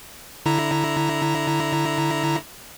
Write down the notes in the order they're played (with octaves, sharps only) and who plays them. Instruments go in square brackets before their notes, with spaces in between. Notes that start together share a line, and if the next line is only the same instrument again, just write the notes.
[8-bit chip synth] D3 E4 A#5